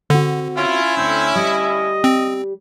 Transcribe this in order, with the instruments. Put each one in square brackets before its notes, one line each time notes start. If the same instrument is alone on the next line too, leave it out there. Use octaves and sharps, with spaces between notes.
[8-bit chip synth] D3 [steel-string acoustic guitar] C4 F#4
[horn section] C#4 E4 [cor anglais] F4
[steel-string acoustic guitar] D2 D4 [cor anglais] C4
[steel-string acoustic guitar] G3 G4 [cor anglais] D#5
[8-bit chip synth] C4